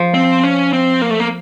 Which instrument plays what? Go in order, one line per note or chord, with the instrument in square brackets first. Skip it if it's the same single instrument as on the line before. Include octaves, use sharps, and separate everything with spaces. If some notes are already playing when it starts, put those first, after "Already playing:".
Already playing: [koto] F3
[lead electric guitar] C4
C#4
C4
A#3
A3
A#3